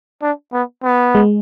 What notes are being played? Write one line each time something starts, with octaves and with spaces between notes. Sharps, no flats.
D4
B3
B3
G#3